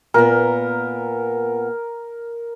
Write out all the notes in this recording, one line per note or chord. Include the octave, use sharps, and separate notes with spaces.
A#2 B3 A#4